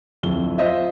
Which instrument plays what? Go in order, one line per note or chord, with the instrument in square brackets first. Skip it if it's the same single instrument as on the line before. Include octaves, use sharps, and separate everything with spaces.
[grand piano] D1 F2 G7
F4 C5 D#5 E5